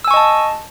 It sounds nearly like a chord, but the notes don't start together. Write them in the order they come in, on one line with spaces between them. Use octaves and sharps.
E6 G#5 C#6 D#5 A5